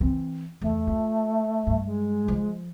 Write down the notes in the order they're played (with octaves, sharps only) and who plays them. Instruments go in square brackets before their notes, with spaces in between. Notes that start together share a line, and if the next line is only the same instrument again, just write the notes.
[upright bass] E3 C4
[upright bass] E2 [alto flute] A3
[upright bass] F4
G2
[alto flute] G#3
[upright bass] F3